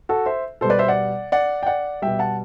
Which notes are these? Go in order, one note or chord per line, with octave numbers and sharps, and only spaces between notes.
F#4 A4
C5 E5
B2 G3 A4 C5
B4 D5
C5 E5
D5 F#5
D5 F#5
G5
D5 F#5
B2 G3 E5 G5
F#5 A5